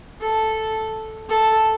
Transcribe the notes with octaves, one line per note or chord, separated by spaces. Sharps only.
A4
A4